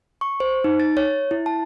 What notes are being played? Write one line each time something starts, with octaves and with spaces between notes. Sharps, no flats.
C#6
C5
D#4
A6
C#5
E4
A5